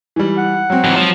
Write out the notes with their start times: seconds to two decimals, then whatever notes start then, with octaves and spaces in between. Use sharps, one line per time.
0.16 E3 G3
0.38 F#5
0.70 F#3 C4
0.84 G#2 E3
0.96 F3 F#3